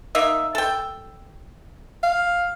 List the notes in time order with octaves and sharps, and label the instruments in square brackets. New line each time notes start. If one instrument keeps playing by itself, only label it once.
[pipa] A#3 D#4 E5
A4 G5
[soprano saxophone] F5